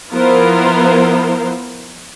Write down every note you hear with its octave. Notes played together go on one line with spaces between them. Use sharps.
F3 B3 E4 F4 A#4 C5